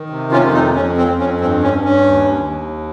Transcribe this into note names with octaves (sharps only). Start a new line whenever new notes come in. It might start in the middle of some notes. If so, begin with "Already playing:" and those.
Already playing: D#3
C3
C#4 F4
F2
F4
C4 D#4
F2 C#4
C4
F2
C#4
G2 C4
C#4
G2
C#4
D#2
D#2